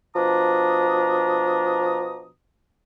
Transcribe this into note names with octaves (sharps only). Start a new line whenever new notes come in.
B2 F3 D4 A#5 D#6